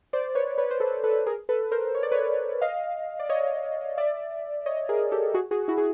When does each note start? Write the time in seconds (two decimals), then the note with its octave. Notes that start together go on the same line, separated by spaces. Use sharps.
0.13 C5 D5
0.35 B4 C#5
0.58 B4 C#5
0.71 C5
0.80 A4 B4
1.03 A4 B4
1.26 G#4 A#4
1.49 A4 B4
1.72 A#4 C5
1.95 C#5
2.03 D5
2.12 B4 C#5
2.61 D#5 F5
3.20 D5
3.29 C#5 D#5
3.97 D5 E5
4.66 C#5 D#5
4.89 G#4 A#4
5.11 G4 A4
5.34 F#4 G#4
5.51 F#4 G#4
5.68 E4 F#4
5.78 G#4